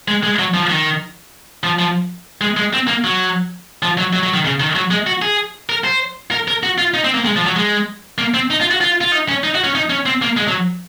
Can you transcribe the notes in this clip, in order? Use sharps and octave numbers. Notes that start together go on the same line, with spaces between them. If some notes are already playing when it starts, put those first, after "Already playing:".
G#3
G#3
F#3
F3
D#3
F3
F3
G#3
G#3
C4
A#3
F#3
F3
F#3
F#3
F#3
D#3
C#3
D#3
F#3
G#3
F#4
G#4
A#4
C5
A#4
A#4
F#4
F4
D#4
C4
A#3
G#3
F3
F#3
G#3
A#3
C4
D#4
F4
F#4
F4
F4
D#4
C#4
D#4
F#4
C#4
D#4
C#4
C4
A#3
G#3
F#3